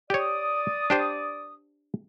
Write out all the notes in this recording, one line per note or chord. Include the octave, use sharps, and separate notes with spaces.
G4 C#5 D5 D#6
D4 G4 C5